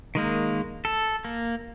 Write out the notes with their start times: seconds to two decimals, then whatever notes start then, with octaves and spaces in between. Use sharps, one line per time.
0.15 D#3 G#3 A#3
0.85 A4
1.25 A#3